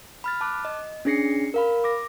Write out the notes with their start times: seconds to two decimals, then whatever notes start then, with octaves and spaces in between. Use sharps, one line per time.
0.24 B5 F6 A6
0.41 A5 D6 F#6
0.65 D#5
1.05 C#4 D4 G#4 A#6 C7 C#7
1.54 A#4 F5 B5
1.84 D6 A#6